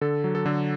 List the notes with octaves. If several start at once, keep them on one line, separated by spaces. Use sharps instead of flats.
D3 A4
F#3
A4
D3